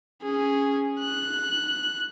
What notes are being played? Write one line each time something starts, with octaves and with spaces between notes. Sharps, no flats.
C#4 G#4
F#6